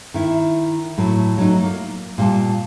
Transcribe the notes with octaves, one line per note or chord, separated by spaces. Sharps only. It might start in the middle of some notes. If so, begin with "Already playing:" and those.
D#3 E4
A2 F#3
F#3 A3 D#4
A#3
A#2 G3 A5